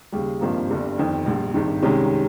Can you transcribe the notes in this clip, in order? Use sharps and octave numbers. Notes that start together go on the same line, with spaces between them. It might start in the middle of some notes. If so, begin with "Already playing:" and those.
D#2 C#3 G3
G#1 G2 F3 A#3
G1 G2 G3
G1 F2 D#3
A#1 A#2 G3
G#1 G2 D#3
C2 C3 D#3 G#3 C#4